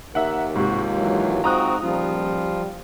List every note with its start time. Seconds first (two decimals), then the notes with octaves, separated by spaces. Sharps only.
0.15 D#2 A#4 E5 F#5
0.56 G#2 C3 F4 F#4
0.96 E3 F#3
1.44 G#2 C4 F#4 A#5 D#6 F#6
1.82 D#1 F3 G3 F4